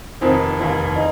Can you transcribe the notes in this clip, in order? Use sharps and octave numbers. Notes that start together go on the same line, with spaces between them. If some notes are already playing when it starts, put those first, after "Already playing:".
F1 F2 D#3 C4
F1 D#2 D#3
D#4